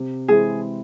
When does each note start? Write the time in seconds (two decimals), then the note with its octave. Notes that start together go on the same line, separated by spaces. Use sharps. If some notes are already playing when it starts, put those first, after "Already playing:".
Already playing: C3
0.28 E3 G#3 C4 E4 G#4